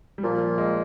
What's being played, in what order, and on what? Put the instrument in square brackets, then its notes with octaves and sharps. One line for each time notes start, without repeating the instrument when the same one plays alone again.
[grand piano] G3
[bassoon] A#2 [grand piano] F3
[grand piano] G#3